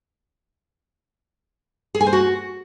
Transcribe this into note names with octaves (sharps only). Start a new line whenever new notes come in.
G#4
G#5
C5
F#4